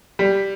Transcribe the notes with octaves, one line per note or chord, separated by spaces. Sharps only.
G3